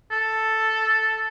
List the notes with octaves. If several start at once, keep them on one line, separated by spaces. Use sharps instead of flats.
A4